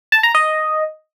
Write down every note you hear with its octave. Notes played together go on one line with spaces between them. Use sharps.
A5
A#5
D#5